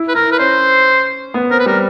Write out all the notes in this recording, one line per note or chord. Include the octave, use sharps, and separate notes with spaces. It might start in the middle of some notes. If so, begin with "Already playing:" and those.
Already playing: E4
B4
E4 A#4
B4
C#4 C5
B3
C4 A#4
B4
G3 A#4